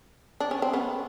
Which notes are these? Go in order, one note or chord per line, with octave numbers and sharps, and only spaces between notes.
D4
C#4
C4
B3 C#4